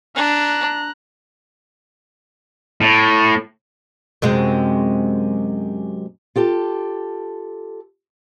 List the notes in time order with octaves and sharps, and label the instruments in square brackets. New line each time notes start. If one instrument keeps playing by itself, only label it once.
[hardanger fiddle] D4 [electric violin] A#5 F#6
[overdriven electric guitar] A2
[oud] F#2 C3 G#3
[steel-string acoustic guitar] F4 G4 A4